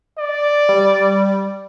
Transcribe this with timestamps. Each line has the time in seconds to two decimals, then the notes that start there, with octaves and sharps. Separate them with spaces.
0.18 D5
0.69 G3